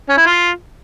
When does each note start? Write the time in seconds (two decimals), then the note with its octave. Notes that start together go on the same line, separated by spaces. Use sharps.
0.09 C#4
0.18 E4
0.26 F4